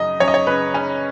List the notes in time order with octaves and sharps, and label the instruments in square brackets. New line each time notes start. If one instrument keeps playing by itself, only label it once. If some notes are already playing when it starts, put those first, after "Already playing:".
Already playing: [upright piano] F#2 C#3 D#5
F#2 C#5
D#5
C#5
C#3 B4
C#3 C#4